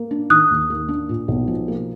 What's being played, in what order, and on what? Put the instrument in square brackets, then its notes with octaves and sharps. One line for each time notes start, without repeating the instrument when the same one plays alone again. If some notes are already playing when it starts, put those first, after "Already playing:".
Already playing: [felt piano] A#3
D4
[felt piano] D#3 [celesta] D#6 F#6
[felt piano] D#2
A#3
D4
A#2
B1
F3
A#3